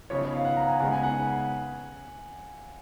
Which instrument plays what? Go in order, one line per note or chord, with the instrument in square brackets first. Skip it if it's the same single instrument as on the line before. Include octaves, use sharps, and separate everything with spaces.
[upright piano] C#3 F3 B3 D#4 [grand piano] C#5
[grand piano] F5
F#5
A#5
G#5
[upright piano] C#3 G#3 B3 D#4 [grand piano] F#5
[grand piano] G#5
F#5